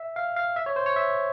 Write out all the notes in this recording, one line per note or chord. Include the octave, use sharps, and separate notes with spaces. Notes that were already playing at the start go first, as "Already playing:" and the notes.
Already playing: E5
F5
F5
E5
C#5
C5
C#5
E5